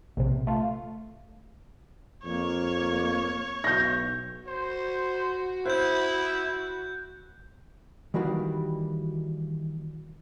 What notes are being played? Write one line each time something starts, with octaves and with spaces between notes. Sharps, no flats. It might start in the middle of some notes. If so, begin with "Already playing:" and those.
A#1 C3
A3 F4
F2 A#3 C#5
B1 G6 A#6
F#4 C5
E4 C5 F#6 G6
D#3 E3 G3 A#3 F#4 G4